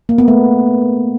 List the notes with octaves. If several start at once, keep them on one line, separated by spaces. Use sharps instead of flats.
A#3
B3
A3